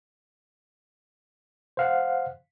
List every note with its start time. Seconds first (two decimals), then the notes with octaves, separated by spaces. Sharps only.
1.77 C5 F5 F#5